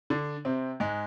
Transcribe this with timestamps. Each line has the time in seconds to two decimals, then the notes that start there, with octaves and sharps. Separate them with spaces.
0.10 D3 D4
0.45 C3 C4
0.80 G#2 G#3